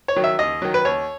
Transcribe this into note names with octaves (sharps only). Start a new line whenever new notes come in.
C#5
D#3 F#3
E5
D#2 D#5
D#3 F#3
B4
D#2 C#5